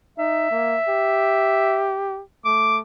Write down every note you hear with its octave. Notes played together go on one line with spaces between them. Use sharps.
D#4 E5
A#3
G4
A3 D6